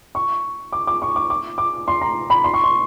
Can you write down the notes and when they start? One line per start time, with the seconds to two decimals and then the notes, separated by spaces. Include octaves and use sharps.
0.15 C#6
0.72 D6
0.87 D6
1.02 C#6
1.16 D6
1.30 D6
1.58 D6
1.88 C6
2.01 A#5
2.30 B5
2.44 C6
2.54 C#6
2.64 C6